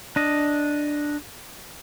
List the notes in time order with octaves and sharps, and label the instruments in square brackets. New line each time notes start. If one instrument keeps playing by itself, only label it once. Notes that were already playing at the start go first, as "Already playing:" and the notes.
[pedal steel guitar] D4 D#5